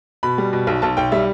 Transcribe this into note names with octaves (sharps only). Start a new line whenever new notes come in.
B2 B5
G3
B2
B1
B1 A5
B1 G5
G3 E5